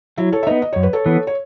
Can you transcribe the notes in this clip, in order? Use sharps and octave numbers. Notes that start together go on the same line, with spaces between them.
F#3 E4
A4 C#5
E5
B3 D#4 B4 D#5
D#5
F#2 C#5
B4
A4 C#5
E3 B3
C#5